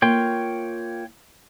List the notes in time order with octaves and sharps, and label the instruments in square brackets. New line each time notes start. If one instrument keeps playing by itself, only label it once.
[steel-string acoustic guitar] A#3 F4 [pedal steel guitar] C#5 G5 C6